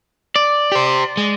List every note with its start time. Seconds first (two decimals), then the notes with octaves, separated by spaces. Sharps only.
0.36 D5
0.72 G4 C5
1.17 G#3